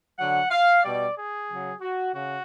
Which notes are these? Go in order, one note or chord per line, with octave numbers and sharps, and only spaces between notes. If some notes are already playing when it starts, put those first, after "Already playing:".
D3 F#3 F#5
F5
B2 G3 D5
G#4
C#3 F#3
F#4
C#3 F#4